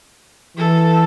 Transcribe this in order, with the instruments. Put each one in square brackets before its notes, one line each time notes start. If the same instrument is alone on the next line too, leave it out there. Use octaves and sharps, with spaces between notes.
[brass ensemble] E3 [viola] A4